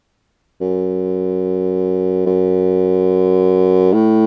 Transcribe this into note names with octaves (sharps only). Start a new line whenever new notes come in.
F#2
F#2
A2